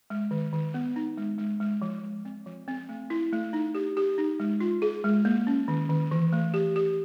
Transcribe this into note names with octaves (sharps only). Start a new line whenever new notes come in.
G#3
D#3
D#3
B3
D#4
G#3
G#3
G#3
F3
G#3
C4
F3
C4
A3
E4
A3
D#4
G4
G4
D#4
G#3
F4
G#4
G#3
A#3
C#4
D#3
D#3
E3
A3
G4
G4